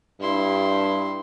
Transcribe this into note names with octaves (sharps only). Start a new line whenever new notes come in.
G2 E4 C6